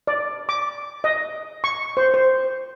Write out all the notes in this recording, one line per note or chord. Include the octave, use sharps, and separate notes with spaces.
D5
D6
D#5
C#6
C5
C5